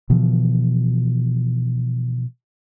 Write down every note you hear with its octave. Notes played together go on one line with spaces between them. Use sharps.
B2 D3 E3 F3